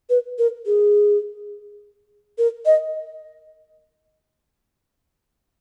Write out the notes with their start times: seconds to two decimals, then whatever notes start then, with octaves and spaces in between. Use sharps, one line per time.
0.10 B4
0.39 A#4
0.66 G#4
2.38 A#4
2.66 D#5